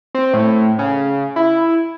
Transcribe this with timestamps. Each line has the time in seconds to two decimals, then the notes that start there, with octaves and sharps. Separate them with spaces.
0.15 C4
0.34 A2
0.79 C#3
1.36 E4